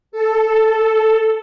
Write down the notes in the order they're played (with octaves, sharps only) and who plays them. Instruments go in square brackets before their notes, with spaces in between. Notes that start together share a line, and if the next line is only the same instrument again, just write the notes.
[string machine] A4